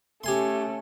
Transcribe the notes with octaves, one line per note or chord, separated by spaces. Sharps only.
A3 C#4 G4 G#5 C6